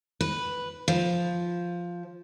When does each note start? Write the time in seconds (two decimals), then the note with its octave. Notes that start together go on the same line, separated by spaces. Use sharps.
0.21 B4
0.88 F3